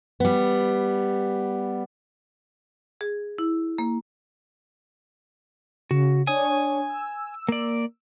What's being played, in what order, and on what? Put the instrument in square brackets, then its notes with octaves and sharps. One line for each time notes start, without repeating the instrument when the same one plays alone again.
[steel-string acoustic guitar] G3 B3
[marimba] G#4
E4
A#3
[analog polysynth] C#3 [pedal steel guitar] F#4
[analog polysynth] D4 C#5 [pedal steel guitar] G#5 D#6
[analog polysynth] E6
[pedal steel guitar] A#3 D5